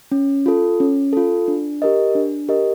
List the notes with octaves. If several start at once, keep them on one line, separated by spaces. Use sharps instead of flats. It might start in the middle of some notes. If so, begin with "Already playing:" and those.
C#4
F4 A4
C#4
F4 A4
D4
G4 A#4 D#5
D4
G4 A#4 D#5